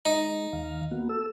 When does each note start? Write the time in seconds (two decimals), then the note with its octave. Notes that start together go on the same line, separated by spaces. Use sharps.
0.06 G#3 D#4
0.53 D#2 D#3 F5
0.91 A#3 B3 F#4
1.09 A4 E6